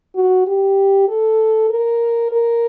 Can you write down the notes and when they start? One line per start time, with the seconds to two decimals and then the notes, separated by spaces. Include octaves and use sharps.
0.15 F#4
0.46 G4
1.08 A4
1.69 A#4
2.31 A#4